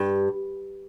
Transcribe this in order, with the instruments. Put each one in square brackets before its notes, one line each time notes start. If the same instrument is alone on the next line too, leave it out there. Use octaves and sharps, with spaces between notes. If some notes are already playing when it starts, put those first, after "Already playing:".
Already playing: [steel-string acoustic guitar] G2